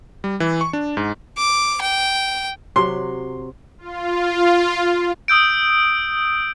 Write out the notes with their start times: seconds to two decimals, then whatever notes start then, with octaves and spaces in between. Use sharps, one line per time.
0.24 G3
0.40 E3
0.61 C#6
0.73 D4
0.97 G#2
1.37 D6
1.81 G5
2.76 C3 F#3 C6
3.78 F4
5.28 D#6 E6 G6 D7